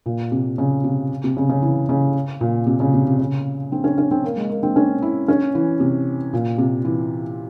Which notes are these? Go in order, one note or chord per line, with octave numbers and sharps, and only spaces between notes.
A#2
C3
C#3
C3
C3
C#3
C#3
E3
C#3
A#2
C3
C#3
C3
C3
C#3
C4
C#4
C#4
C4
A#3
G#3
A#3
C4
C#4
E4
C#4
E3
C3
A#2
C3
E3